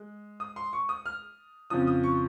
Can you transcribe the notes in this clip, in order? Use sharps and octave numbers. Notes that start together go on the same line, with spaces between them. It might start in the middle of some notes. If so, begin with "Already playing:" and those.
Already playing: G#3
D#6
C6
C#6
D#6
F6
F2 C#3 F3 D#6
D#6
C#6